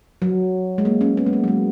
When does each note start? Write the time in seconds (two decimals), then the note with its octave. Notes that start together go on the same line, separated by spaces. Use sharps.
0.22 F#3
0.78 G#3
0.85 A#3
1.01 C#4
1.17 B3
1.26 G#3
1.33 A#3
1.44 F#3
1.48 G#3